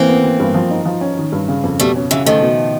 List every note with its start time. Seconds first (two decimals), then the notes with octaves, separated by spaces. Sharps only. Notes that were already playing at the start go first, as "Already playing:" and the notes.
Already playing: E3 A#3 C4
0.09 B3
0.23 E3
0.40 G2
0.54 F3
0.71 D#4
0.85 F3
1.01 C#4
1.17 D#3
1.32 G2
1.49 C#3
1.64 F2
1.80 B2 G3 A3
1.96 C#4
2.11 C#3 E3 F#3
2.26 D#3 F3 A3
2.42 B2